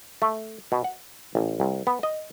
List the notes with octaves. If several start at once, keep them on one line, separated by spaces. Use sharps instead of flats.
A3
B2
F#5
A1
C2
B3
D#5